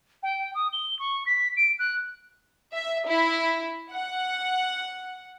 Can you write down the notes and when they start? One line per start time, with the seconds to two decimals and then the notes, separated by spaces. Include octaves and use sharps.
0.23 G5
0.54 D#6
0.72 G7
0.99 C#6
1.26 B6
1.56 D7
1.78 F#6
2.72 E5
3.07 E4
3.91 F#5